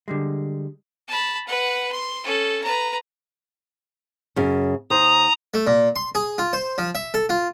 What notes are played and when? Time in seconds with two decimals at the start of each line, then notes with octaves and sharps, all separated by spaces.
0.08 D3 G3 G#3
1.08 A5 B5
1.47 B4 F#5
1.92 C6
2.23 C#4 A4
2.64 B4 A#5
4.36 F#2 C#3
4.90 D#2 C5 A#5 D#6
5.54 A3
5.67 A#2
5.96 C6
6.15 G#4
6.38 F4
6.53 C5
6.78 F3
6.95 E5
7.14 A4
7.29 F4